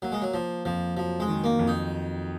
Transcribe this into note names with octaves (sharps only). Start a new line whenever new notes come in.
F#3 A#3
G#3
F#3
F3 A#3
F2 F3
F3 F#3
G#3
D#3
A#3
F2
D#4